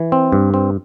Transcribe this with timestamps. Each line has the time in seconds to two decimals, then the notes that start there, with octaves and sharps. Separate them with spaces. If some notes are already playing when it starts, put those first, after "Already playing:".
Already playing: E3
0.12 C4
0.32 G2
0.54 C4